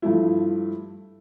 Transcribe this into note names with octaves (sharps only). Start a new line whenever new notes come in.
G2 F3 A3 E4